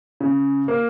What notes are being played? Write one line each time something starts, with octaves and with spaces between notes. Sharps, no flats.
C#3
A#3